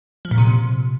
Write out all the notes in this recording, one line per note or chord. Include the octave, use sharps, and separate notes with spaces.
F3
A#2
C3